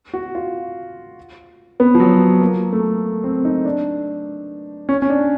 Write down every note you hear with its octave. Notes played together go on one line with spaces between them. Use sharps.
F#4
F4
B3
F3
F#3
A#3
A3
C4
D#4
D4
C#4
C#4
D4